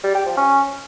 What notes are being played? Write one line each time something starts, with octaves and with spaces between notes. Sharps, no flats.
G3
G4
F3
C#4